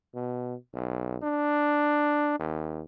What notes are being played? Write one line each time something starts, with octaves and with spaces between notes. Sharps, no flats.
B2
B1
D4
D#2